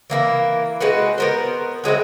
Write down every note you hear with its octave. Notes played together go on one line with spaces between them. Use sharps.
E3 A#3 D#4 E4
G#3 D#4 F#4 B4
B3 A#4 C5
F#3 G#3 C4 E4